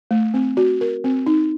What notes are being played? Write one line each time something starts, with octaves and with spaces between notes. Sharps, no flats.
A3
C4
F#4
A#4
C4
D#4